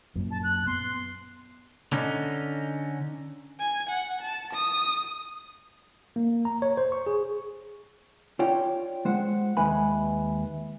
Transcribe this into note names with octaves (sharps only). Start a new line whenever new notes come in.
F#2 A#2
A5
F#6
B3 C6
D3 C#4 D#4
G#5
F#5
A5
D#6
A#3
A#5
C#5
C5
C#6
G#4
F4 C#5 D5 G5
G#3 C5 F#5
D#2 G#3 B4 E5 G#5 B5